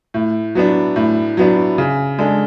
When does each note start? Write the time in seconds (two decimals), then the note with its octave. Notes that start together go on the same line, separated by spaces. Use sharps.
0.14 A2
0.55 F#3 B3 D4
0.96 A2
1.37 F#3 B3 D4
1.78 C#3
2.18 G#3 D4 A4